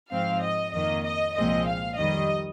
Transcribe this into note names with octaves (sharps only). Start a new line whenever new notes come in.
G#2 F3 C4 F5
D#5
F2 D#3 A#3 D#5
D#5
C2 A#2 F3 G#3 C4 D#5
F5
F2 D#3 G3 D#5